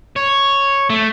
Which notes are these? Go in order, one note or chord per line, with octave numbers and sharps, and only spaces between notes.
C#5
A3